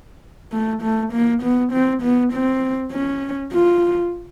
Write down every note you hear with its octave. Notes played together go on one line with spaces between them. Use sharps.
A3
A3
A#3
B3
C4
B3
C4
C#4
F4